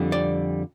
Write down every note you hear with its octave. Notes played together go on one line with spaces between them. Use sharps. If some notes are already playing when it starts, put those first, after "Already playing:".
Already playing: F2 D3 G3 C4
D5